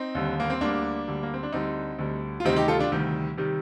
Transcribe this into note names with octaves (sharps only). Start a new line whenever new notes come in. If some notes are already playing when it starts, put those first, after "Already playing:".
Already playing: C4 D#4
D#2 D3 G3
A#3
C4
D2 D3 G3 A#3 D4
D2 D3 G3
A#3
C4
D4
D2 D3 G3 C4 D#4
D2 D3 G3
F4
D2 C3 D#3 G3 C4 D#4
D#4 G4
F4 A4
D4 F4
D2 C3 D#3 G3
C3 D#3 G3